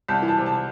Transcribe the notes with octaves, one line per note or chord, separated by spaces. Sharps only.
C2 A5
E3
A5
C3
A5